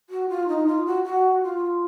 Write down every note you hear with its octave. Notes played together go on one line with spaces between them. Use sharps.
F#4
F4
D#4
F4
F#4
F#4
F4